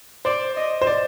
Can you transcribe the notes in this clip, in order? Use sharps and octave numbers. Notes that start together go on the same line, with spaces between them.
C5 D5
D#5
C5
D5